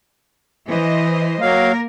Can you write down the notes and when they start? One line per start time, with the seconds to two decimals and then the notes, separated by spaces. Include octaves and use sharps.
0.66 E3 C5 D#5
1.41 F#3 A#3 A#4 F5